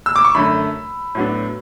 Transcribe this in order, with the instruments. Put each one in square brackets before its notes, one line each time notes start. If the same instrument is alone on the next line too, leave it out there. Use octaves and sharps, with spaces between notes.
[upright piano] E6
D6
C#6
F#2 D3 A3 D4 B5
A2 F#3 B3 D4